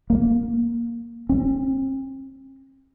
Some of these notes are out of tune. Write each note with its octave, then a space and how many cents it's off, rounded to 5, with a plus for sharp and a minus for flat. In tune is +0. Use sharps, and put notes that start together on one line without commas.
A#3 +5
C4 +45